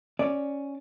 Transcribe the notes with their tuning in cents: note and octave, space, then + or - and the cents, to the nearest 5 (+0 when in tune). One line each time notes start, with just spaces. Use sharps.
C#4 +0 D5 +0